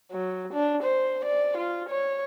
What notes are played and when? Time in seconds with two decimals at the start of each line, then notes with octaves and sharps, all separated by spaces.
0.12 F#3
0.53 D4
0.83 C5
1.25 D5
1.57 F4
1.89 C#5